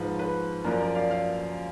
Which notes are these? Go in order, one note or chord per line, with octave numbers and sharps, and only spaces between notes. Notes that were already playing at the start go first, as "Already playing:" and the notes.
Already playing: G#2 F3 B4
B4
F#2 F3 A#4 D5
A#4 D5
D5 F5
D5 F5